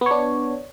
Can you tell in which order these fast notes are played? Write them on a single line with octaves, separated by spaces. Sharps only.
B3 C#5 D4